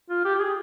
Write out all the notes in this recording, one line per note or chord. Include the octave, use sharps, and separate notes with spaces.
F4
G4
G4
G#4